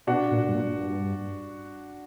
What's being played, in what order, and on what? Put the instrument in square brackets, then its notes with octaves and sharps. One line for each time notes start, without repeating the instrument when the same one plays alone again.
[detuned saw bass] B2 [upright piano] D4 F#4
[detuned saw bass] A#2
G2
A#2
G2